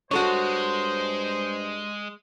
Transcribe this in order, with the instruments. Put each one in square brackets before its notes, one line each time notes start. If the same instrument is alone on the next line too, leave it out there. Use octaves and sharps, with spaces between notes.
[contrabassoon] G2 [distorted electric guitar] G#3 [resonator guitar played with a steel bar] F#4 A4 C#5 [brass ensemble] C5